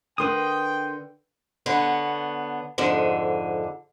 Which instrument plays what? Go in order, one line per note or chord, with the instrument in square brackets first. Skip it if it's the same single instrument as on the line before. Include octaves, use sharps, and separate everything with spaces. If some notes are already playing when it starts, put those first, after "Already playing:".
[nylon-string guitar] D3 A#4 B4 [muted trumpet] G5 [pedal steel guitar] C6 D#6
[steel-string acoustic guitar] D3 B3 C#5
F2 G#2 D3